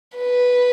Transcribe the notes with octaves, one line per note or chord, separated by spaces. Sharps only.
B4